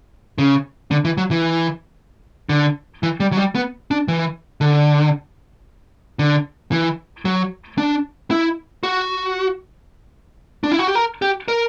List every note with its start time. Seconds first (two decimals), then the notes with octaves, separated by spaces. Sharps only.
0.38 C#3
0.91 D3
1.05 E3
1.17 F#3
1.31 E3
2.49 D3
3.03 E3
3.20 G3
3.32 F#3
3.37 G3
3.55 B3
3.91 D4
4.08 E3
4.61 D3
6.19 D3
6.72 E3
7.25 F#3
7.78 D4
8.31 E4
8.83 F#4
10.64 D4
10.72 E4
10.79 F#4
10.87 G4
10.95 A#4
11.22 G4
11.48 A#4